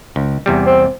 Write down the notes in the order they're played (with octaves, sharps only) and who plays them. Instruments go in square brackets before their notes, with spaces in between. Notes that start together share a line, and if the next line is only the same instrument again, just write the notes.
[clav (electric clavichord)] C#2
E2 C3 G3
[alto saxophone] C4